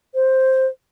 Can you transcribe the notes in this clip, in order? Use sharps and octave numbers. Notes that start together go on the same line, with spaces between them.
C5